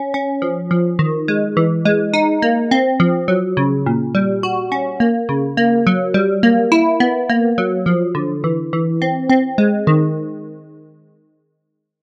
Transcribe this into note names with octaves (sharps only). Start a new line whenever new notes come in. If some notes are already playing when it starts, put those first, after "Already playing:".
Already playing: C#4
C#4
F3
F3
D#3
G#3
E3
G#3
D#4
A#3
C4
F3
F#3
C#3
A#2
G3
F#4
C#4
A#3
C#3
A#3
F#3
G3
A#3
E4
B3
A#3
F#3
F3
D3
E3
E3
C4
C4
G#3
D#3